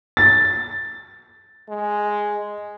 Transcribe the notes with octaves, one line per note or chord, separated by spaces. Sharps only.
A6
G#3